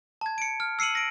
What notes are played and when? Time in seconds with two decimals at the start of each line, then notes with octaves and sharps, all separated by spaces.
0.21 A5 G#6
0.38 C#7 D7
0.60 F6
0.79 E6 C7 C#7 D#7 F#7
0.95 A#6 D7